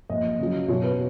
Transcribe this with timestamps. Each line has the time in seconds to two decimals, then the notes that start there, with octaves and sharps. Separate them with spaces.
0.10 A#2 F3 D#5
0.39 C#3 F#3
0.68 B2 F#3 C#5
0.83 B4